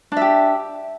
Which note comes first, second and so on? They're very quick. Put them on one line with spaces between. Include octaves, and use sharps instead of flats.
D4 E5 G4